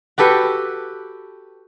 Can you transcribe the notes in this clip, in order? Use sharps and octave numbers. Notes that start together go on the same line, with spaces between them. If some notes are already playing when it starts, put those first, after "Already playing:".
F#4 G4 A4 B4